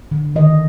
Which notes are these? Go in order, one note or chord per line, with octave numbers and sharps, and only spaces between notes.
D3
D#3 D#5